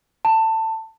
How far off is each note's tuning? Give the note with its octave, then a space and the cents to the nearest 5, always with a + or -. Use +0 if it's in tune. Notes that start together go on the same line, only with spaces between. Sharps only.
A5 +20